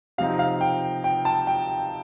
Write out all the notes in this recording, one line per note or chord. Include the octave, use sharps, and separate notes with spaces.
C3 F3 C4 D#4 F5
F5
G5
G5
A5
G5